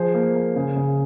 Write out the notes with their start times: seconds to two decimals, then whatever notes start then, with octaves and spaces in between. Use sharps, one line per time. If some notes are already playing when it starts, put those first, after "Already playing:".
Already playing: F3 G#4 C5
0.14 A#3
0.35 A#3
0.56 C#3
0.76 C#3